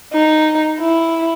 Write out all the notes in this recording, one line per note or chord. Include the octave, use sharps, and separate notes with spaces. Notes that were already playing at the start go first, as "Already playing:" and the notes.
D#4
E4